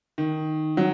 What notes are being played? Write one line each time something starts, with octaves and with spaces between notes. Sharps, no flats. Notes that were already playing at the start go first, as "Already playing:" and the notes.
D#3
F#3